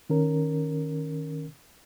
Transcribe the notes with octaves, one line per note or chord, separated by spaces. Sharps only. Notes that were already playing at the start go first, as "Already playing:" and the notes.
D#3 C#4 A#4